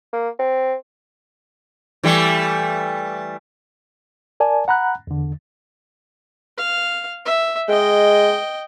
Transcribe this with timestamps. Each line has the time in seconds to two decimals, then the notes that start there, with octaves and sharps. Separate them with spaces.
0.13 A#3
0.39 C4
2.03 E3 G3 A3
4.40 A#4 D5 G#5 A5
4.68 F#5 A#5 B5 F#6
5.07 E2 D3
6.58 F5
7.26 E5
7.69 G#3 D#5 G5